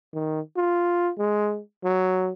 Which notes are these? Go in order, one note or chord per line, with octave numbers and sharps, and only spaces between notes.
D#3
F4
G#3
F#3